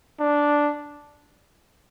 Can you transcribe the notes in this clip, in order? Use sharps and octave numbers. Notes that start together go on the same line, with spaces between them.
D4